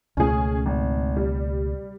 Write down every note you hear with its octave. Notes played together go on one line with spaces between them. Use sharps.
C#2 B2 A3 C#4 G#4
G#1
G3